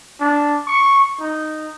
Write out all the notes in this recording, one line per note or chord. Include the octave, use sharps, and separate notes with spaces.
D4
C#6
D#4